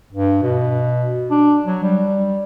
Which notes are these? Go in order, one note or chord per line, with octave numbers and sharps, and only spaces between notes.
G2
B2
D4
F#3
G3